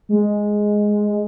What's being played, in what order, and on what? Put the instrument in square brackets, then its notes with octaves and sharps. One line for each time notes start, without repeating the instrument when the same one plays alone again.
[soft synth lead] G#3